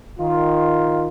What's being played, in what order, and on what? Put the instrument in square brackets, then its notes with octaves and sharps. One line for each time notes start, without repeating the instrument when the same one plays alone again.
[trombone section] D#3 F4